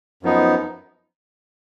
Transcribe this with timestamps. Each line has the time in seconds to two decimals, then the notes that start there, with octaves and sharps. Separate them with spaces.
0.23 F#2 F3 B3 D#4